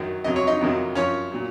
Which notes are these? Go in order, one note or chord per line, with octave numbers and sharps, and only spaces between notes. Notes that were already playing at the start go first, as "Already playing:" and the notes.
Already playing: F#2 D#3 F#3
F2 C3 F#3 D#5
C#5
D#4 D#5
F2 C3 D#3 F#3
F#2 F3 C#4 C#5
A#2 F#3